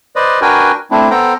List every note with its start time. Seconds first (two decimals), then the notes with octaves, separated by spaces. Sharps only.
0.16 B4 C5 D5 D#5
0.41 D4 F#4 A#4 B4 G5 G#5
0.91 A3 C4 D4 E4
1.11 B3 A4 C5 G5 A#5